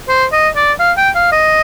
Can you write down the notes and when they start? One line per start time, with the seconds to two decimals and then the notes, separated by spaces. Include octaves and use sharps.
0.09 C5
0.33 D#5
0.56 D5
0.80 F5
0.98 G5
1.15 F5
1.33 D#5